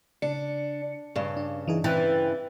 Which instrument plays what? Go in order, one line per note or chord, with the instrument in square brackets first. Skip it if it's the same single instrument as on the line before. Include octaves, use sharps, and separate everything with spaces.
[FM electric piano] C#3 C#7 [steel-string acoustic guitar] D4
[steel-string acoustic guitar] G2 C#3
[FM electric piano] D4
E3 D#4 G#4
[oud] E3 [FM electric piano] C4 G5 A6